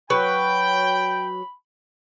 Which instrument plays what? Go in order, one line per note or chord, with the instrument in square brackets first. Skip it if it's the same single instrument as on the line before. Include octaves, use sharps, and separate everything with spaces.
[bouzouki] F#3 B4 [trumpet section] G5 [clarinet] B5